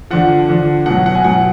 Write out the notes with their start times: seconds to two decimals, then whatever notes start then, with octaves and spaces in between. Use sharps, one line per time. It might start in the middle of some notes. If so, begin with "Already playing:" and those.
0.10 D3 F3 F#5
0.49 D3 F3
0.86 B2 F#3 F#5
1.06 F#5
1.15 G#5
1.24 B2 F#3 F#5